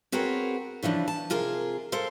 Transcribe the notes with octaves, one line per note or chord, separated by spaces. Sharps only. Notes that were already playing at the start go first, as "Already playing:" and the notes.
C4 F#4 G#4 A#4 B4 C#5
C#3 E3 F3 D4
A5
C3 F4 G#4 A#4
A4 A#4 C5 F5